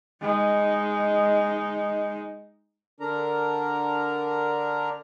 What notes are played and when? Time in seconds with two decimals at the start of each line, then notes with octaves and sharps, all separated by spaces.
0.21 G#3 D#4
3.00 D3 D4 A#4 A#5